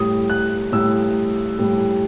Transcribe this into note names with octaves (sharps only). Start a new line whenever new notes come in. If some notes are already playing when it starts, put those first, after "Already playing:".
Already playing: A2 G3 D#6
F#6
A2 G3 E6
A2 G3